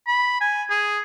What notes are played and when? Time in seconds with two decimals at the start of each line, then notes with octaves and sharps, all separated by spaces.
0.07 B5
0.41 G#5
0.70 G#4